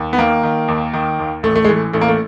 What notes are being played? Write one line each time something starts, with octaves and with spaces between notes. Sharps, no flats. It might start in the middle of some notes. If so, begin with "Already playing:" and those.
Already playing: D#2
B3
D#3 A#3
D#3
D#2
D#3
D#2
A1 A3
A3
G#3
E3 A3
A1 A3
A#3
A3